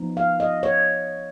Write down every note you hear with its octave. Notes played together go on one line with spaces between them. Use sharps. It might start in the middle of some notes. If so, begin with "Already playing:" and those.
Already playing: F3 B3 D#4
F5
D#5
C#5